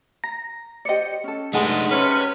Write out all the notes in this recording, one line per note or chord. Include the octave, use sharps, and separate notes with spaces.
A#5 A#6
G4 C5 D5 D#5 C#7
C#4 A4
G2 G#3 A3 D#4 F#5 G#5 A5
C3 C#4 B4